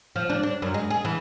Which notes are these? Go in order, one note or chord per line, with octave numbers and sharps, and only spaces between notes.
F3
D4
D4
F#2
G#3
G#4
E3